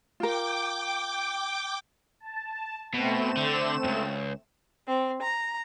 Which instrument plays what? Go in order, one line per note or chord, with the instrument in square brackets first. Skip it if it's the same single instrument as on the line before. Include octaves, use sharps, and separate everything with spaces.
[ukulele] F4 A#4 [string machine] G5 D6
[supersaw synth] A5
[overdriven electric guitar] B2 [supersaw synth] A3 C4 E7
[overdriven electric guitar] D3
C#2 F#2
[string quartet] C4
A#5